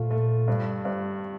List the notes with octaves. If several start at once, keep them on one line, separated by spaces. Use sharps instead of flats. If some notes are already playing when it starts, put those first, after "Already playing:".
Already playing: A#2 A3 F4
A3
G2
G2